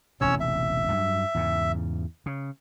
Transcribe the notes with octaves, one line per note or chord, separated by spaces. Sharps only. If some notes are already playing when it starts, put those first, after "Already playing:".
E1 A1 C3 C#4 C#5 E6
E5
G2 F#3
E2 G#2 C#3
C#3